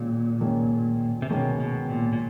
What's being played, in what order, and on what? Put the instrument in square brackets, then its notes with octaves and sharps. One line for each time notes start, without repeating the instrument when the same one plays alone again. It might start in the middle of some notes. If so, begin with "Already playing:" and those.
Already playing: [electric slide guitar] A#2 [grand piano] D#3 G#3 C#4
[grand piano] D#3 G#3 C#4
[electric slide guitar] C3
[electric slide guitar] B2 [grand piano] D#3 G#3 C#4
[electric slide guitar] B2
A#2
A#2